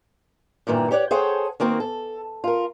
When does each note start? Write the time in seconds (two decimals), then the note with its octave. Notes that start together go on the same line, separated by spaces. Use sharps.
0.67 G2 A#2 D#3 E3
0.91 G4 C#5 D5 F#5
1.11 G#4 A4 C5 C#5 F#5 G5
1.60 D#3 A#3 C4 F#4
1.80 A4
2.44 F4 A#4